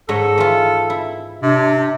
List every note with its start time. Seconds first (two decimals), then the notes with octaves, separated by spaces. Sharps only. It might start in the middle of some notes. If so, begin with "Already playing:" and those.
0.09 G#2 A4 C#5 D#5
0.38 E3 F4
0.90 E4
1.43 C3 D4